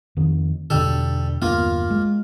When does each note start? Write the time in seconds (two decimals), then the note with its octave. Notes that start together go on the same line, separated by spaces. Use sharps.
0.17 F2 D#3
0.70 E2 B2 D3 G3 A4
1.42 G1 E2 A#3 B3 F4
1.90 G#3